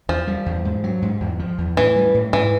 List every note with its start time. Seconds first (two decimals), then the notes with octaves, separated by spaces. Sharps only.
0.09 E2 F3
0.27 G3
0.46 E2
0.65 G#2
0.84 F#3
1.02 G#2
1.21 E2
1.39 F3
1.58 E2
1.77 A2 E3
1.96 G3
2.14 A2
2.33 G#2 E3